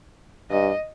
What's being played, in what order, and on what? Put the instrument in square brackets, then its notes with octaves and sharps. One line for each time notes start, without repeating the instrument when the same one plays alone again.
[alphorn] G2 [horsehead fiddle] D#5